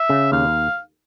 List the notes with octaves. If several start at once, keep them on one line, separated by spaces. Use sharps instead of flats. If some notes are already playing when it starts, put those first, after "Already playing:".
Already playing: E5
C#3
D#2 F5